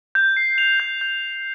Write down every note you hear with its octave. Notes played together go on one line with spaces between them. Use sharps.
G6
C7
F7
G6
G6